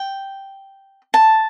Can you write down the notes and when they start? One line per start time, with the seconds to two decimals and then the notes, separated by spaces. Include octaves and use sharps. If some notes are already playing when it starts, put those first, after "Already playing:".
Already playing: G5
1.14 A5